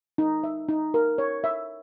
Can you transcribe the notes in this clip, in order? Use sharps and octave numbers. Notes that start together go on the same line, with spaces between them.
D#4
E5
D#4
A#4
C#5
E5